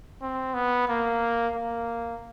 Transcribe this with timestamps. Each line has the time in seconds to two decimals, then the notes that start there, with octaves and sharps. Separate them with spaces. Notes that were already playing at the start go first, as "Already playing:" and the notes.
0.21 C4
0.54 B3
0.88 A#3
1.55 A#3